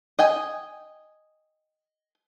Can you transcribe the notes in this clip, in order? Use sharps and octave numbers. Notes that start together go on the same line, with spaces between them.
D#5 G5 G#5